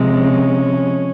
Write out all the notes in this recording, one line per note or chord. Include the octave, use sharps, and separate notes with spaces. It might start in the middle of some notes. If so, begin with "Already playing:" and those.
Already playing: C3 F3 G#3
C#4